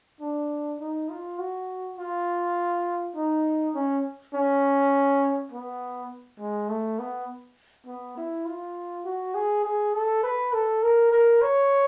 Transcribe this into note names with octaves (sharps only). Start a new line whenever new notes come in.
D4
D#4
F4
F#4
F4
D#4
C#4
C#4
B3
G#3
A3
B3
B3
E4
F4
F#4
G#4
G#4
A4
B4
A4
A#4
A#4
C#5